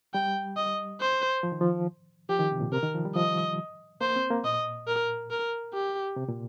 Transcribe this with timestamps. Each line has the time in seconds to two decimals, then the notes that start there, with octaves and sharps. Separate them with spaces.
0.14 G3 G5
0.57 D#5
1.01 C5
1.43 F3
1.52 D#3
1.61 F3
2.29 F3 G4
2.40 D#3
2.51 C3
2.61 A#2
2.72 C3 A#4
2.83 D#3
2.94 F3
3.05 G3
3.15 F3 D#5
4.01 A#3 C5
4.16 C4
4.30 A#3
4.44 A#2 D#5
4.87 A#4
5.31 A#4
5.73 G4
6.16 C3
6.29 A#2